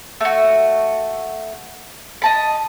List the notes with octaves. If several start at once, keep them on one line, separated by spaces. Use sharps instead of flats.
A3 F#4
D#5 A5 B5